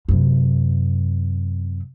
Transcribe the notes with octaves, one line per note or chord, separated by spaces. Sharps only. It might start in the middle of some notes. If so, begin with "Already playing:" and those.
F#2 C3